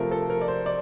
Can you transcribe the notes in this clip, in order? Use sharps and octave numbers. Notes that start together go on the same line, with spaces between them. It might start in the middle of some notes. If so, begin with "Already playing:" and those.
Already playing: C3 F3 A3 A#4
A4
A#4
D5
C5
D5